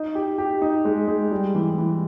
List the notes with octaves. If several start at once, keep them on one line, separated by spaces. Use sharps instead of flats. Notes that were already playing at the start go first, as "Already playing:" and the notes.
Already playing: D#4
G4
G4
D#4
G#3
G#3
G3
E3
E3